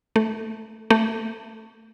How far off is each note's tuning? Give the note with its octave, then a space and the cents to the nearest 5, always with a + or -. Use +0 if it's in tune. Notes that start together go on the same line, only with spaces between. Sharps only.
A3 +0
A3 +15